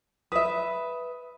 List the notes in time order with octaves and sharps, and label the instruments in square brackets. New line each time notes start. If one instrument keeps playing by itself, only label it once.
[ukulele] B4 E5 [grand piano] D#6